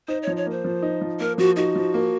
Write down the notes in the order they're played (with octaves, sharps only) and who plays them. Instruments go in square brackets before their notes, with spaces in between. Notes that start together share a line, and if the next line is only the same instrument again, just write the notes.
[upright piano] D#4 [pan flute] C5
[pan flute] C#5
[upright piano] F3
[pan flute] C#5
[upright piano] A#3 [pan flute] C5
[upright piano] F3
D#4
F3
[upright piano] A#3 [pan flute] A#4
[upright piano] F3 [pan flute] F#4
[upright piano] D#4 [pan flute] F#4
[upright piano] F3
A#3